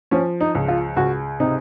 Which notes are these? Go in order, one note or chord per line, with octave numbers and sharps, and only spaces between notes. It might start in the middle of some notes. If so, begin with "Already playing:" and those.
F3 C#4
D#4
C#2
F4
C#2 F#4
C3 D#4